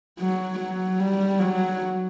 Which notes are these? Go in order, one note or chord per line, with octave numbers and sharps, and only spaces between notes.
F#3
F#3
G3
F#3